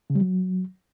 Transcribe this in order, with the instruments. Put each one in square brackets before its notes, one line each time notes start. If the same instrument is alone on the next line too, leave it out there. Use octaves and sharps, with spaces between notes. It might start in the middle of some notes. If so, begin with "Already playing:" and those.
[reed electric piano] C#3
G3
F#3